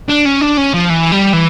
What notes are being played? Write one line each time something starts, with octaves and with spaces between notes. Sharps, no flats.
D4
C#4
D4
C#4
F3
E3
G3
E3